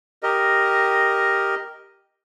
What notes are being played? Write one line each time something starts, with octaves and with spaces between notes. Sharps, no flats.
G4 A#4 D#5